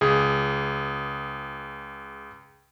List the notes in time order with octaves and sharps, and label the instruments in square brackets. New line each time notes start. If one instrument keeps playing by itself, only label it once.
[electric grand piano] C#2 G#4